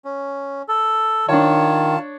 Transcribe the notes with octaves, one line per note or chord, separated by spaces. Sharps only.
C#4
A4
D#3 D4 F4 C#5 A5